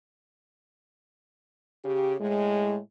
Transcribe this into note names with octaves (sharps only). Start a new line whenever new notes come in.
C#3 G4
A2 G#3